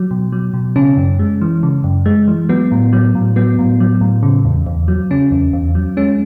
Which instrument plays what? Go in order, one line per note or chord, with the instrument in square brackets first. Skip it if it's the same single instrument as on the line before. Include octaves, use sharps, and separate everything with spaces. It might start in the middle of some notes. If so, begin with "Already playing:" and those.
Already playing: [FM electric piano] F#3
B2
F#3
B2
C#3 C#4
F#2
G#3
E3
C#3
F#2
G#3
E3
F#3 B3
A2
F#3
A2
F#3 B3
A2
F#3
A2
C#3
E2
E2
F#3
C#3 C#4
E2
E2
F#3
G#3 C#4